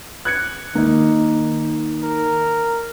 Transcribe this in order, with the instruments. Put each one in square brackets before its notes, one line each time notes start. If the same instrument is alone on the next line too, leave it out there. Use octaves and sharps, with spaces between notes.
[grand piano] F#6 G#6 C#7
[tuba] D#3 [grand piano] A#3 D#4
[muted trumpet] A#4